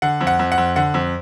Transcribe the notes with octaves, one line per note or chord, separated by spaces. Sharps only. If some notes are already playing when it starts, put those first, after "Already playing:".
D3 F#5
F2
F#5
F2
F#5
F2
D3 F#5
F2